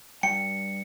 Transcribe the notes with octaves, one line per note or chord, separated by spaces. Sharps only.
G2 G5 C#7